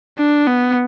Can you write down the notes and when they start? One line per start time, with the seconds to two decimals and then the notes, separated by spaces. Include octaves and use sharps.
0.18 D4
0.47 B3